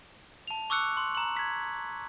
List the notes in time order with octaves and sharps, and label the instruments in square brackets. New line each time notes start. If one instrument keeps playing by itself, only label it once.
[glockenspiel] A5 F7
C#6 D6 E6 F#6 C#7
C6
A#5 F#7
G#6 B6